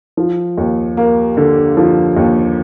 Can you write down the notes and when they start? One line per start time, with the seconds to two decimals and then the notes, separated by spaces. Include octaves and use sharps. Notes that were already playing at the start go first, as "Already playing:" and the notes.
0.17 F3
0.57 D#2
0.97 A#3
1.37 D3
1.77 F3
2.16 D#2